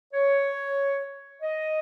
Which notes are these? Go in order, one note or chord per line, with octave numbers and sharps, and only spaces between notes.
C#5
D#5